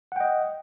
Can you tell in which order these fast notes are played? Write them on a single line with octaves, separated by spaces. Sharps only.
F#5 G5 D#5